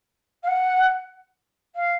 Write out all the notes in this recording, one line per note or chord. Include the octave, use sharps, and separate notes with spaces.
F5
F#5
F5